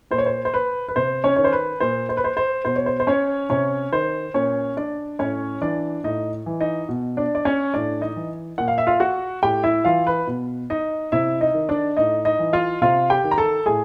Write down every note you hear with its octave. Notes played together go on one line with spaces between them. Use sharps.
A#2 C5
C#5
C5
C5
B4
B4
C3 C5
C#4 C#5
D#3 C#5
C5
B4
A#2 C5
C5
B4
C5
C5
B2 C5
C#5
C5
C5
C#4 C#5
C3 C#4 C#5
D#3 C5
A#2 C#4 C#5
D4 D5
A2 C#4 C#5
E3 D4 D5
A2 D#4 D#5
E3
D#4 D#5
B2
D4 D5
D5
C#4 C#5
A2 D4 D5
D#4 D#5
E3
A#2 F#5
F5
E5
F4 F5
F#4 F#5
A2 G4 G5
E4 E5
E3 F4 F5
B4
B2
D#4 D#5
C3 E4 E5
D#4 D#5
D#3
D4 D5
A2 D#4 D#5
D#4 D#5
E3
F4 F5
C3 F4 F5
G4 G5
D#3
A#5
A4 A5
A2 G#4 G#5